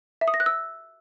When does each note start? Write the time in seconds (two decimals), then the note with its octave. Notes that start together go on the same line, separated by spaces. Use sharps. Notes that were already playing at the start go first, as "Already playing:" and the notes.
0.21 E5
0.28 D#6
0.34 A#6
0.40 F#6
0.46 E6